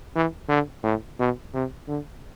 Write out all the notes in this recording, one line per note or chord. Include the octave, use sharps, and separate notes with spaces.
E3
D3
A2
B2
C3
D3